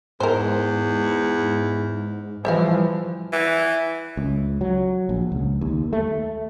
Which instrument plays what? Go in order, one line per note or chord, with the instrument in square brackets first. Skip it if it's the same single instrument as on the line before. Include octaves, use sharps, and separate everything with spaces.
[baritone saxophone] E2 [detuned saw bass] G#2 [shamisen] A#4 C5
[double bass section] E3 F3 [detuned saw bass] G3 [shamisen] C5 E5 F5
[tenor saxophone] E3
[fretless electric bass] C#2
F#3
A#1
C#2
D#2
A3